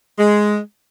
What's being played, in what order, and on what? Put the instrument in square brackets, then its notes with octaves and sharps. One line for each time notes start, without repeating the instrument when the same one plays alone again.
[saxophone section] G#3